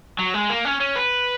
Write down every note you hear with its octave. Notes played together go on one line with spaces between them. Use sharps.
F#3
G#3
A#3
C#4
C#4
B4